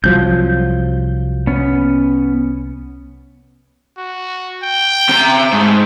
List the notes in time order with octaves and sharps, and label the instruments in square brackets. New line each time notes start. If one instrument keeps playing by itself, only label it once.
[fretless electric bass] C2 F3 F#3 [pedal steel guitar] G6
[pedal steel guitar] B3 C#4
[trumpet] F#4
G5
[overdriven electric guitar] C3 A#5
[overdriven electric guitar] G#2 [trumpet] A3